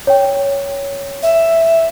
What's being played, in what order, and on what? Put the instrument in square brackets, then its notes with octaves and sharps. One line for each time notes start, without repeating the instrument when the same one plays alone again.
[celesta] C#5 G5
[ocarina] E5